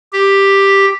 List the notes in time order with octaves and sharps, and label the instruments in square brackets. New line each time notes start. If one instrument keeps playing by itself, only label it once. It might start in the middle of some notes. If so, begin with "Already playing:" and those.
[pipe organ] G4